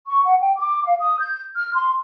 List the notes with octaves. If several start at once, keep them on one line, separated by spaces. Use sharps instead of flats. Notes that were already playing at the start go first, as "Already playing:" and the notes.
C#6
F#5
G5
D6
F5
D#6
G6
F6
C6